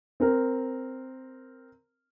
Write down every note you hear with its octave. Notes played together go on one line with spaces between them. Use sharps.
C4 A#4